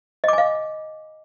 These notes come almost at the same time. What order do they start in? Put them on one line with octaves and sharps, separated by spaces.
D#5 D6 G#5 F5